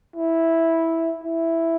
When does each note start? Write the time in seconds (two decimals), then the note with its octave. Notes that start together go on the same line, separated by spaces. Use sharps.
0.16 E4
1.24 E4